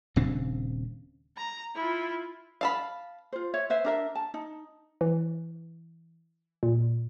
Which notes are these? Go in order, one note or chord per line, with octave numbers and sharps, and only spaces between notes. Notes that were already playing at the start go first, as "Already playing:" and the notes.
D#1 C#3 C4 D4
A#5
E4 F4
F5 A5 B5
F4 C5
C#5 E5
B4 C5 E5
D4 A#4 E5
A5
D#4
E3
A#2